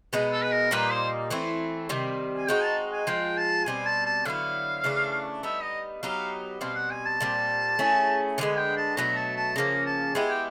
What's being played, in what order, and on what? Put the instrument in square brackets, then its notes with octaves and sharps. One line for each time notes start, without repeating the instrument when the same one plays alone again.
[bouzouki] B2 G#3 B3 D#4
[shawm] A4
B4
A#4
[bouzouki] A#2 G3 A#3 D#4 [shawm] B4
[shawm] C5
[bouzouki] E3 A3 C4 E4
C3 D#3 G3 C4
[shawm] G#5
[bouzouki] G#3 C4 D#4 F#4 [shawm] G5
[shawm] A5
G#5
[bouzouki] F3 G#3 C4 F4 [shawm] G5
[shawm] A5
[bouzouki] B2 G3 C4 [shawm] G#5
[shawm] A5
A5
[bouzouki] D3 F#3 B3 E4 [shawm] F5
[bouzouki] C#3 E3 A3 D4
[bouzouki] G3 B3 D#4 [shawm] E5
[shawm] D#5
[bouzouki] F#3 B3 D#4 G4 [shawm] F5
[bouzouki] B2 G3 C4 [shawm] F5
[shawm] F#5
G#5
A5
[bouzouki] A#2 G3 C4
A3 C#4 E4 G#4
[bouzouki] D3 F3 G#3 B3 [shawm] G#5
[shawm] G5
A5
[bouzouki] B2 F#3 A3 [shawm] A#5
[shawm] A5
A5
[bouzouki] C#3 F3 A#3 C#4 [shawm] A#5
[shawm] A5
[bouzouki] G#3 B3 E4 G4 [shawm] G#5
[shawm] G5